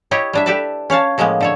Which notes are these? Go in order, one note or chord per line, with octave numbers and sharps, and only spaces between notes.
E4 G4 C#5 D#5
G3 D4 E5
G4 A4 B4 D5 E5 A5
C#4 C#5 F5 A5
A2 F3 G#3 A#3 B3
D3 A4 C#5